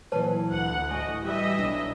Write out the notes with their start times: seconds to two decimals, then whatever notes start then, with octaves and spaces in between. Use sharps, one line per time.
0.12 A#2 E3 F#3 B4 C5 A5
0.51 D2 F#5
0.91 A2 F#4 D#5 G#5
1.24 E3 G3 D#5 E5
1.58 B1 D4